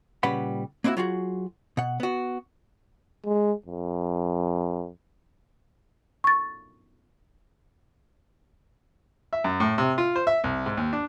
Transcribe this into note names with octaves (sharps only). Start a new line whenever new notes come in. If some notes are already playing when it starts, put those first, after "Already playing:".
A#2 C#3 G3 B4 F#5 B5
A#3 C4 D4 E4 F#4
F#3 F4 F#4 G#4
B2 F#5
B3 F#4
G#3
F2
C#6 A6
E5
F#2
A2
C3
F4
C5
E5
C2
G#2
D#2
D4